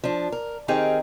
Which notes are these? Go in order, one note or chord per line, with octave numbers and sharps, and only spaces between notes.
F3 D4
A#4
D#3 C4 D#4 G4 G#4 A#4